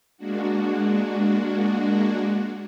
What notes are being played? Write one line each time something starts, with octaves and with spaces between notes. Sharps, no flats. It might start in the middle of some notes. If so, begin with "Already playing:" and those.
G#3 A#3 D4 F#4